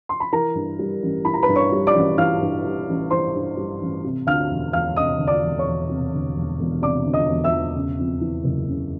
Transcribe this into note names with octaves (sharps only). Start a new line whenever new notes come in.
C6
B5
E3 A#4 A#5
G2
G3
A1
E3 B5
A#5
B4 B5
G2
C#5 C#6
G3
D5 D6
A1
E3 F5 F6
G2
G3
A1
E3 C5 C6
G2
G3
A1
C3
D2 F5 F6
E1
E1 F5 F6
C3 D#5 D#6
D2
D5 D6
E1
C#5 C#6
E1
C3
D2
E1
E1
C3 D5 D6
D2
D#5 D#6
E1
E5 E6
E1
C#3
F2
E3
F#1
C#3